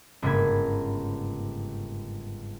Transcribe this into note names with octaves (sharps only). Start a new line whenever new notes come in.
G1 G#2 C#3 A#3 B5 G#6